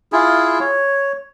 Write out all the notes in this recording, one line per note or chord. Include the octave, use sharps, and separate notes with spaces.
E4 F4 G#4
C#5